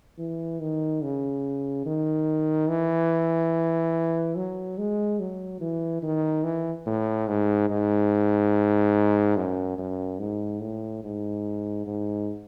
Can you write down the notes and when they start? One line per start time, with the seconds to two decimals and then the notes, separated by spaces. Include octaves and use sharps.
0.18 E3
0.60 D#3
1.02 C#3
1.86 D#3
2.69 E3
4.36 F#3
4.78 G#3
5.20 F#3
5.60 E3
6.02 D#3
6.44 E3
6.86 A2
7.27 G#2
7.70 G#2
9.36 F#2
9.78 F#2
10.20 G#2
10.61 A2
11.04 G#2
11.86 G#2